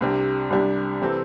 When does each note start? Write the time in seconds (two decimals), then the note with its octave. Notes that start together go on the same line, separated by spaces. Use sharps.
0.01 C2 C3 G3 D4
0.50 C2 C3 G3 D4
1.01 C3 E3 C4 A4